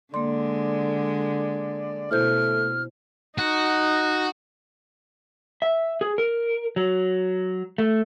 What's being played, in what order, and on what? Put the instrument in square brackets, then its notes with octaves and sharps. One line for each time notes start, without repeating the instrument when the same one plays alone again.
[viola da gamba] D3 G#3 [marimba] A#3 C6 [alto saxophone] D5
[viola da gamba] B2 [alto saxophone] A3 [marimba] E4 C5 G6 [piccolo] F6
[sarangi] D#4 [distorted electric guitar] F#4
[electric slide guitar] E5
G#4
A#4
F#3
A3